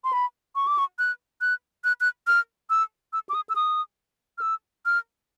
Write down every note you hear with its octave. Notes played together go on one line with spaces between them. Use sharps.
C6
B5
C#6
D6
C#6
F#6
F#6
F#6
F#6
F6
E6
E6
D6
D#6
E6
D#6
F6
E6
F6